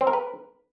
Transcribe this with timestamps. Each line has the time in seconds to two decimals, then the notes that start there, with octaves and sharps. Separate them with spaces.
0.01 C4
0.07 A#4
0.13 B4